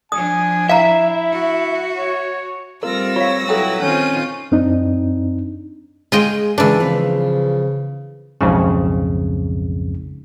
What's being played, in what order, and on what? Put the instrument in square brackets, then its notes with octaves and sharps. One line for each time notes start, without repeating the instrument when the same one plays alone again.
[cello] F3 D4 [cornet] G#5 [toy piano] D#6
[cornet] E4 [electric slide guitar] E5 [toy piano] F5 A#5
[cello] F#4
[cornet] C#5
[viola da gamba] G3 A3 C4 [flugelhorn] F4 [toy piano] A#4 [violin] E6 A#6
[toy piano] F4 F5 [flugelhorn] C#5
[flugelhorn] F#3 [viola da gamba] E4 B4 [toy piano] A4 G5
[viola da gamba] D#3 C4 F4 [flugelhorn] C#4 [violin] G6 D#7
[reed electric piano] F#2 C4 D4 D#4
[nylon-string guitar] G#3 G#4 [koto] F4 D#5 G5
[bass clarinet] C#3 [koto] E3 D4 [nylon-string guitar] G#3 C#4 A#4
[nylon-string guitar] F3 C4 B4
[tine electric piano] B1 F2 G#2 C#3